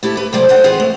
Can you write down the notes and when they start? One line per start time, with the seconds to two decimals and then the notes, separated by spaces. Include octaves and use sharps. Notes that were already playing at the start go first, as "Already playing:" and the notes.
0.03 A3 E4 G4 A5
0.16 G4 B4
0.33 C3 F#3 A3 C5 D5 G5
0.49 A4 C5 D#5 F#5 G5
0.64 E3 C4 F4 G#4 B4 C5
0.80 A3